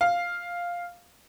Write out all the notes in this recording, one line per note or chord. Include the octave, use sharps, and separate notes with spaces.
F5